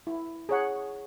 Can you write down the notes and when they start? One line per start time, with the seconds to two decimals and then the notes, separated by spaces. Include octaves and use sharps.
0.07 E4
0.49 G#4 C#5 F#5